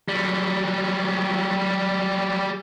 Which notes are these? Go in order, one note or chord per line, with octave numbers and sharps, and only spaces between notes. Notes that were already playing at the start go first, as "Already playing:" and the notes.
F#3 G3